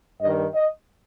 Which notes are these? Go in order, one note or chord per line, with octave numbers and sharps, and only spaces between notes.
G2 D#3 D#5
D#5